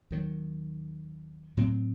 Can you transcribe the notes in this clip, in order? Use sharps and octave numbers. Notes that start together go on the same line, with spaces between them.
D#2 D#3 F#3
A2 F#3 C4